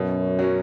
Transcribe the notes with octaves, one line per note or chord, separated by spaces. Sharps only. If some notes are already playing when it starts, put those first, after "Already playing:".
Already playing: F#2 B2
F#3 C#4